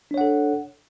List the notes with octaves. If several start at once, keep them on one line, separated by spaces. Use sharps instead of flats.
D4 A4 C#5 F#5